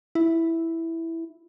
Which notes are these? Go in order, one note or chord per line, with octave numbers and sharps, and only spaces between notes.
E4